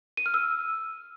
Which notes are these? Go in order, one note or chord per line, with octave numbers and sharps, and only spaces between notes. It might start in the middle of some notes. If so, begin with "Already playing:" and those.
D#7
F6
E6